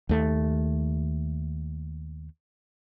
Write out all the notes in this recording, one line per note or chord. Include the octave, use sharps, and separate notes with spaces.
D#2 A3